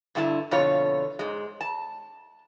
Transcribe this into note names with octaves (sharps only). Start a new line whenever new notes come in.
G2 D3 E4 F#4 A5
F2 B2 D3 F4 C#5
G#2 G#3
A5